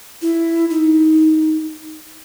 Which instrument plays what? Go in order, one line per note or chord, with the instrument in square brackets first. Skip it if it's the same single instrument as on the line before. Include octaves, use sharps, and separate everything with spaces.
[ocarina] E4
D#4